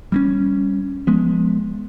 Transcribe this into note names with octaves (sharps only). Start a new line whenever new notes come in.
G3 A#3 C#4
F3 G#3 B3